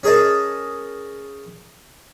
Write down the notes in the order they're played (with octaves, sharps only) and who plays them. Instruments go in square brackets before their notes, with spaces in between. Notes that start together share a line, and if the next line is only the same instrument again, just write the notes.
[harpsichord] C#4 G#4 A#4 D#5 A5